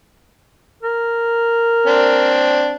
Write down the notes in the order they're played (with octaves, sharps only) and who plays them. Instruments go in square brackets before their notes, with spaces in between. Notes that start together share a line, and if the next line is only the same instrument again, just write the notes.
[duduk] A#4
[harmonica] C4 D4